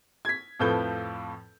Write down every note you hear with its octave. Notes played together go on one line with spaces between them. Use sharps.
G#6 B6
F2 A2 F3 A4 B4 G6